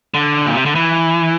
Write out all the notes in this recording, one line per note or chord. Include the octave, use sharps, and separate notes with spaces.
D3
A#2
C3
D3
E3